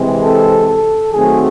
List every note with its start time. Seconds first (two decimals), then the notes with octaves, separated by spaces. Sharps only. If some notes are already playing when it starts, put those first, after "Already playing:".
Already playing: C3 E3 G#3 C4
0.22 A4
0.67 A4
1.12 D#3 F#3 A3 C4 G#4